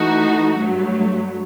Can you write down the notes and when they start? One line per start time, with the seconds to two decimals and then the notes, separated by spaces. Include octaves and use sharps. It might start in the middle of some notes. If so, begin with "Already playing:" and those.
Already playing: E3 A3 D#4 F#4
0.57 G2 F#3 A3